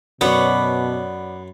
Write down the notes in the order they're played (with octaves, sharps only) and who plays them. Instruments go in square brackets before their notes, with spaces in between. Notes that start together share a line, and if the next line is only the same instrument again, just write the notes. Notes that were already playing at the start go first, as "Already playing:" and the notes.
[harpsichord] F#2 F#5 B5 [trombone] B2 [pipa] B3 [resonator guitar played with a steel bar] C#5 D5